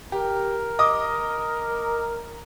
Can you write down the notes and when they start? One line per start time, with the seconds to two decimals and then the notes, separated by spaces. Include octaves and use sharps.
0.12 G4 A#4
0.79 D#5 D6 D#6